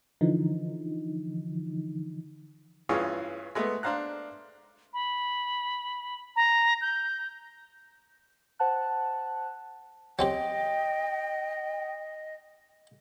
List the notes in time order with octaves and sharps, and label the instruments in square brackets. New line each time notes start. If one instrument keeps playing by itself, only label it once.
[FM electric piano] D3 E3 F3 D#4
[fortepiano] G2 E3 C#4 F4 G#4 C#5
G#3 A3 B3
D4 C5 F5 A#5 F#6
[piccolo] B5
A#5
G6
[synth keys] C5 F#5 A5 F#6
[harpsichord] F#3 C4 G4 [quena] D#5 [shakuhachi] G5